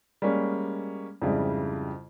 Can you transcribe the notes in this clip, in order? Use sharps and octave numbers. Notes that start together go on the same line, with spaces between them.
G3 G#3 A#3 C#4
F2 G#2 C#3 G3 E4